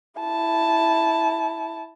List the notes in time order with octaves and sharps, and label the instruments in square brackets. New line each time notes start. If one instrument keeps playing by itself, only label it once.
[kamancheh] E4 A5